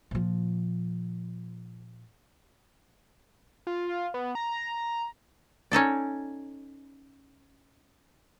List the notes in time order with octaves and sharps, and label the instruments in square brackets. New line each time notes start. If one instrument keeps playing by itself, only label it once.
[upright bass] A#2 F3
[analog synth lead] F4
B3
A#5
[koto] C#4 D#4 A4 D5